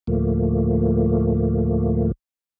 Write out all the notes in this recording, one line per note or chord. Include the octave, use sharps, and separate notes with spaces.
D2 A2 F3 A3 A#3